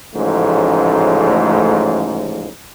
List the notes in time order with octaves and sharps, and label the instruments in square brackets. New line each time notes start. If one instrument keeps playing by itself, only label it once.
[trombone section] A1 G#2 C#3 F3 A3